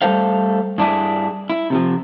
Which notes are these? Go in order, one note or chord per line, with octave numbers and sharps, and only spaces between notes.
G3 A3 A4 C5 F5
G2 D4 E4 G#4
E4
C3 E3 F3